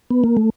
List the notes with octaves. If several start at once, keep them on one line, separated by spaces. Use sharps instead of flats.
B3
A#3
A3